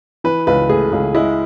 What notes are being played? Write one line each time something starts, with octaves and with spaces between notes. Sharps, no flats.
E3 B4
C#2 B4
A3 G#4
C#2
G#3 E4